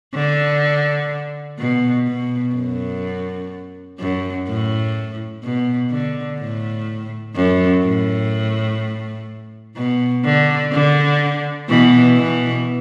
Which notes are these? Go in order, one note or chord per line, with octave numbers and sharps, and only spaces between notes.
D3
B2
B2
F#2
F#2
A2
B2
D3
A2
F#2
A2
B2
D3
D3
B2 E3
B2 E3